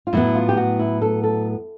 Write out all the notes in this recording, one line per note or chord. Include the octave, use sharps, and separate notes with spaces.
F4
A2 F#3 B3 E4
F4
G4
F#4
E4
A4
A4